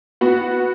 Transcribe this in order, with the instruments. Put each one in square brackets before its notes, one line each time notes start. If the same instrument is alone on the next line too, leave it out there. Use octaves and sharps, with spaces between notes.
[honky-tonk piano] B3 F#4